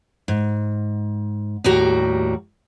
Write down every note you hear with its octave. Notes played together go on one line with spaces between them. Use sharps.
G#2
D#2 A2 G3 F#4 A#5